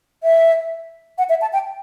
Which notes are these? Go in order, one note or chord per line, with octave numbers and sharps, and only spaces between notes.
E5
F#5
E5
A5
G5